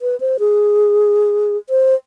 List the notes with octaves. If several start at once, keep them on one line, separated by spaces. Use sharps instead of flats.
B4
C5
G#4
C5